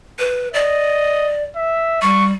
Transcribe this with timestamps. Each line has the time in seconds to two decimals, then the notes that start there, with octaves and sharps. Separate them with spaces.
0.19 B4
0.54 D5 D#5
1.56 E5
2.02 G3 C#6